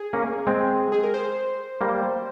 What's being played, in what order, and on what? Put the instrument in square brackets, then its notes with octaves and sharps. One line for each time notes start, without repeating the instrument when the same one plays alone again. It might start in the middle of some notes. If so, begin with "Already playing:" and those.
Already playing: [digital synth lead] G#4
[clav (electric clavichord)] A#3 C#4
G#3 C4
[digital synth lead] G#4
A#4
C5
[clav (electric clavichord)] G3 A#3